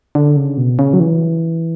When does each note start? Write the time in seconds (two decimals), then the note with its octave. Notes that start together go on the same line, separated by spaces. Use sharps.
0.15 D3
0.36 C#3
0.57 B2
0.79 C#3
0.93 F#3
1.00 E3